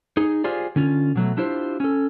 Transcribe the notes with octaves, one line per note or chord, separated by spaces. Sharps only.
D#4 G#4
F4 G4 G#4 C5 D5
D3 C#4 F4
B2 F#3 A3
D4 E4 F4 G4 C5
C#4 A4